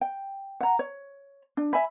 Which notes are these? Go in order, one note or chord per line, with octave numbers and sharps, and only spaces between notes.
G5
F#5 A#5
C#5
D4
E5 G#5 B5